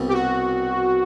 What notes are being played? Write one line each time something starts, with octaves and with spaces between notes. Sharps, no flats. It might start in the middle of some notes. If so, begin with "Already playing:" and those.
Already playing: C2 B2 G3
G4
F#4